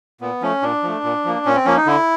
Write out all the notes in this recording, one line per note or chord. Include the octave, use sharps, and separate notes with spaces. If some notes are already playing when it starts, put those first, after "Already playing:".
A#2 B3
F3 A3 C#4
A#2 D4
F3 A3
A#2
F3 A#3
A#2 C#4
C4
F3 A#3 C#4
D#4
D3 E4